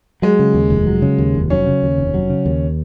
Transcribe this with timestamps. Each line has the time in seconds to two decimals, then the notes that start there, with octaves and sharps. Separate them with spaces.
0.22 F#3 G#3
0.39 C#3
0.54 D#2
0.70 F1
0.87 F#3
1.02 C#3
1.18 D#2
1.35 F1
1.50 F#3 C#4
1.66 C#3
1.83 D#2
1.98 F1
2.14 F#3
2.30 C#3
2.46 D#2